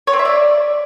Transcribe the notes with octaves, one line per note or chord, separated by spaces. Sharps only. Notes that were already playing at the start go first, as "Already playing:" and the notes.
C#5
C4
E5
D5